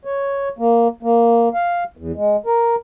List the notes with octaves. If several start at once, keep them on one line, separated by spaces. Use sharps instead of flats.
C#5
A#3
A#3
F5
E2
G#3
A#4